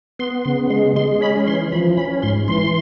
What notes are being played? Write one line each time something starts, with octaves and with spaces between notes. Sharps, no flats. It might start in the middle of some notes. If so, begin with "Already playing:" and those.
B3 C6
C#3 C6
G#3 C6
G#3 C6
C#4 B5
E3 C6
F3 B5
C#4 B5
G#2 C6
E3 C6